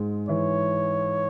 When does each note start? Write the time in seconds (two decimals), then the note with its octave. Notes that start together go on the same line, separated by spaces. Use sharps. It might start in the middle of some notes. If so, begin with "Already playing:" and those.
Already playing: G#2 G#3
0.29 E3 C#5